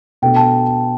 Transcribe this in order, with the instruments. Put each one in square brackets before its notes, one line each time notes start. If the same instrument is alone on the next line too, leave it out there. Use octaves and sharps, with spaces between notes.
[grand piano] B2 A3 D4 [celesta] G5
[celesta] A5